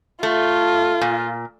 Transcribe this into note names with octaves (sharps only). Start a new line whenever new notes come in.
A3 F4
A#2